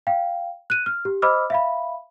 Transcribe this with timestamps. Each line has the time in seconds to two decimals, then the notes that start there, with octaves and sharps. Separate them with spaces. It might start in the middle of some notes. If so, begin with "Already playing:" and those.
0.07 F5 G5
0.70 F#6 D#7
0.86 F6
1.05 G4
1.22 C5 D#5 B5 D6 E6 F6
1.50 E5 F5 B5